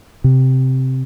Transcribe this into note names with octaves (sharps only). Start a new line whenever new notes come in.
C3